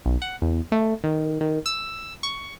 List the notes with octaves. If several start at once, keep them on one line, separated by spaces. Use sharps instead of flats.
B1
F#5
E2
A3
D#3
D#3
E6
C#6